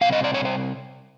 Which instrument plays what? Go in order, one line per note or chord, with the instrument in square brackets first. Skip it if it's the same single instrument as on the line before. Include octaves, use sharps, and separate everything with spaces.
[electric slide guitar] C3 E3 G3 C4 F5
D#5
D5
C#5
C5